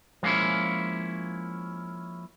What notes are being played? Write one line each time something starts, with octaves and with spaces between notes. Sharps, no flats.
F3 G#3 A#3 C#4 E4